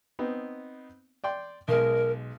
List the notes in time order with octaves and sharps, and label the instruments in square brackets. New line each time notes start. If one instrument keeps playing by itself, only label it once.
[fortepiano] B3 C4 D#4
D5 G5 C6
[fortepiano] B1 G#3 [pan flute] A#4